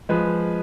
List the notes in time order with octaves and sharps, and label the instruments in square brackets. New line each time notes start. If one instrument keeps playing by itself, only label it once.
[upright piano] F3 G#3 B4